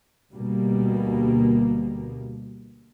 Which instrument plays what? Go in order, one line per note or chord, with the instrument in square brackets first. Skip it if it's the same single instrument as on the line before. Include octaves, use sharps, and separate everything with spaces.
[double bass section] D2 B2 G3 A#3